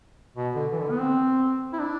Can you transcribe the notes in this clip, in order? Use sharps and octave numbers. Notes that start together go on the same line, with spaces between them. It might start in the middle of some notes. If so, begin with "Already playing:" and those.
B2
D3
E3
D3
B3
C4
E4
D4